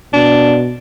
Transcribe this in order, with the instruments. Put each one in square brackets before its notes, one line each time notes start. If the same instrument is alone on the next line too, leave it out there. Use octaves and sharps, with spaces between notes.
[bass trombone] B2 [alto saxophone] D4